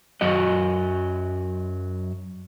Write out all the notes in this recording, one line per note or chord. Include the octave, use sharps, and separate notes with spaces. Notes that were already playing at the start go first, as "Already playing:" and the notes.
F#2 F#3 F#4 D#5